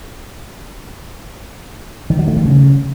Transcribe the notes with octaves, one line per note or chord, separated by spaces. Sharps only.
D#3
F#3
A3
D#3
C#3